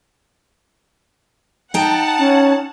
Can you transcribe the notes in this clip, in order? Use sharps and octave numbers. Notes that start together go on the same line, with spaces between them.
D#4 F#5 G5 A5 A#5
C#4